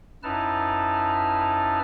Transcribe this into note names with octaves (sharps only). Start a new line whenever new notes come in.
F#2 D#4 E4 B4 A5 F6